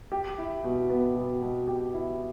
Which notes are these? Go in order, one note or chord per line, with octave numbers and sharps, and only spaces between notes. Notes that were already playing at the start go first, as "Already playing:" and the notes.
G4
E4
B2
B3
B2
B2
G4
E4